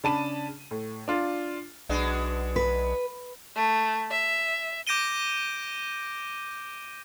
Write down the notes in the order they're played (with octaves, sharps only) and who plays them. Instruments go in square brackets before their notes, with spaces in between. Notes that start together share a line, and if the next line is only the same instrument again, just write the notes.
[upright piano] C#3 D4 A5 B5 D#7
A2
D4 F4
[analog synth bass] B1 [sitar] B2 G#3 D4
[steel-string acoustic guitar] B4
[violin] A3
E5
[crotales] D6 G6 A#6 D7 D#7 G7